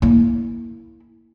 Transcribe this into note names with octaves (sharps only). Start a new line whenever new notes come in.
A#3 E4